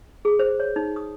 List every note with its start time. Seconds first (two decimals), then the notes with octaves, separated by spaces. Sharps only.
0.25 G#4
0.39 C5
0.60 C#5
0.76 D#4
0.96 D#6